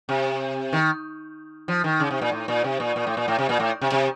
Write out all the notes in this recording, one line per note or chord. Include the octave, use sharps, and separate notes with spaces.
C3
D#3
F3
D#3
C#3
C3
A#2
A2
A#2
C3
A#2
A#2
A2
A#2
A2
C3
A#2
A2
C3
C3